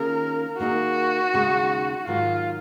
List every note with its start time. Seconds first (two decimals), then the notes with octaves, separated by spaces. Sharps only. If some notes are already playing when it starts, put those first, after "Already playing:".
Already playing: D#3 A#3 C#4 F4 G#4 A#4
0.59 D#3 A#3 D#4 F#4 G#4
1.34 D#2 C#3 G#3 D#4 G#4
2.07 G#2 D#3 F#3 F4